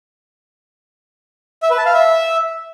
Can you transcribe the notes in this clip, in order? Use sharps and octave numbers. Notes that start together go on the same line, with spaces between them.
E5
B4
A5
F5
E5